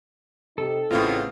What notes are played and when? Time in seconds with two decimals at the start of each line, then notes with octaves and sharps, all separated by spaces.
0.58 C3 D#4 G4 A4
0.90 A1 A2 C#3 A3 B3 C4 F4